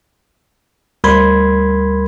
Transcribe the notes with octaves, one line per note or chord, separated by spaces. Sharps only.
D2 G3 A#4 B5 C6 G#6